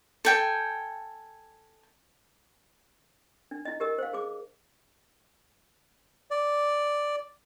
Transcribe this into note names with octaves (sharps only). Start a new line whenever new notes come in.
A4 G5 G#5
D4
E4 D#5
G4 A#4 D#5
C5 F5
G#4 D6
D5